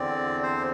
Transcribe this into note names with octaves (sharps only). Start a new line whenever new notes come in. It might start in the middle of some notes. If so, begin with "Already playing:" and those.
Already playing: E2 D3 C4 D5
C5